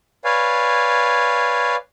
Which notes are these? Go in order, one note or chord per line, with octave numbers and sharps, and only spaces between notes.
B4 C#5 D5 F5 G#5